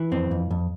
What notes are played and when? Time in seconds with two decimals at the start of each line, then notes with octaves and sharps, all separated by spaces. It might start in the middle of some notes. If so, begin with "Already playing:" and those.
Already playing: E3
0.11 F2 C4
0.31 F2
0.51 F2